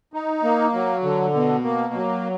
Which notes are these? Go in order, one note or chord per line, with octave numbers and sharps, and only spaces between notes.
D#4
A#3
F#3
D3
B2
A#3
F#3